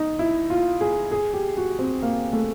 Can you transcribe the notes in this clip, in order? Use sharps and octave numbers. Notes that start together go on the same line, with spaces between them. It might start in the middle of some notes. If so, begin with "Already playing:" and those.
Already playing: D#4
E4
F4
G#4
G#4
G4
F#4
C4
A#3
A3